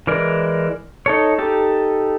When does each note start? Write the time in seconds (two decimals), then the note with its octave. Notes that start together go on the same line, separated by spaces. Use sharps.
0.07 E3 G#3 A#4 D5
1.06 D#4 A4 C#5
1.38 D#4 G4 A4